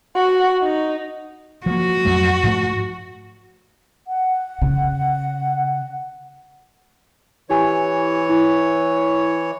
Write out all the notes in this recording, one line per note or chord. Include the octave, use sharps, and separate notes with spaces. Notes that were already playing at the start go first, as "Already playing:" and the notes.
F#4
D#4
F3 F#3 A#3 F#4
F2 F#3 A3
G#2 F3 A3
F#5
C#3
E3 E4 G4 C#5 G#5
E4